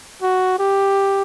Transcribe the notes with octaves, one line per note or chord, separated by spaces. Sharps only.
F#4
G4